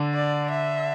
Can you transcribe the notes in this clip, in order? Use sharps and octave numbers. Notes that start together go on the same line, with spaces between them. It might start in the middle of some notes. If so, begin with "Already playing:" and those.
Already playing: D3
D5
E5